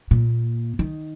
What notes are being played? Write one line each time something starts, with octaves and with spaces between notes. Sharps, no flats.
A#2
D#3